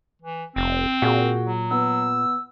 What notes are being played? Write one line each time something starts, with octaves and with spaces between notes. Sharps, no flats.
E3
F1 C4
A#2 F#4 G#4
F#3
B3 E6